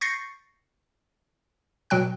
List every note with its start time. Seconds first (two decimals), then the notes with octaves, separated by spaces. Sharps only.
0.01 C#6 G6 A6 A#6 C7 C#7
1.90 B2 F#3 G5 F#6